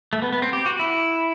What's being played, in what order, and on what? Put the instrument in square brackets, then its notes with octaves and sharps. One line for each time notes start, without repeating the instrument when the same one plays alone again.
[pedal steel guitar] A3
B3
B3
C4
G4
F#4
E4